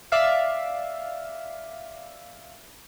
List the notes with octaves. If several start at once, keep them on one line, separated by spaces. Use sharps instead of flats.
D5 E5 F5